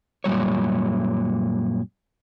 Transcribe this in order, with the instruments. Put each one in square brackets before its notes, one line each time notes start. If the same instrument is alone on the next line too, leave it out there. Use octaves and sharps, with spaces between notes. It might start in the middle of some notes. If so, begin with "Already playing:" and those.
[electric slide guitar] F#2 A#2 G3 C#5